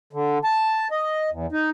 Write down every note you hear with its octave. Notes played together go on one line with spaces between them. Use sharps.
D3
A5
D#5
E2
D#4